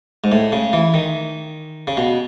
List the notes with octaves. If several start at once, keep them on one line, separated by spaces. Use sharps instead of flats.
G#2
A2
C#3
E3
D#3
C#3
B2